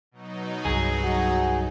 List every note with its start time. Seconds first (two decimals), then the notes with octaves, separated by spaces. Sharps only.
0.11 B2 F#3 D#4
0.65 C2 G2 G#4
1.03 F#4